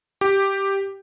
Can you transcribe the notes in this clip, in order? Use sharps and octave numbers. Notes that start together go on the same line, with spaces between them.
G4